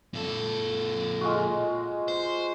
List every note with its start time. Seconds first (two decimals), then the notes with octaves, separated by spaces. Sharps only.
0.14 A#2 A4
1.21 G#3 F4 F#4
2.08 C5